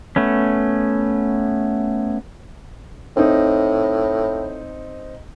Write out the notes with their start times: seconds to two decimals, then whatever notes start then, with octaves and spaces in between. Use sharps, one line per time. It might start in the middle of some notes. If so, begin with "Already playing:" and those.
0.16 A3 B3 C#4
3.17 A2 C4 D#4